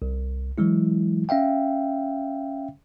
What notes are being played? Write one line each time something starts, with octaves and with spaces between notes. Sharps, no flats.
C2
E3 F#3 G#3 E4
C#4 E5 F5 G5